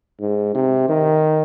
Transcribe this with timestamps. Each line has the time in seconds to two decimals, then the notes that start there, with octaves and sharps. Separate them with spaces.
0.21 G#2
0.55 C3
0.89 D#3